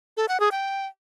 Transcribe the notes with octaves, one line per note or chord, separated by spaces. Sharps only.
A4
F#5
G#4
G5